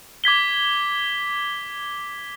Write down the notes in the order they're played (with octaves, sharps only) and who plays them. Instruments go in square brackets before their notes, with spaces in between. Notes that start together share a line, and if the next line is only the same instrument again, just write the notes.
[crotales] D6 G#6 B6 G7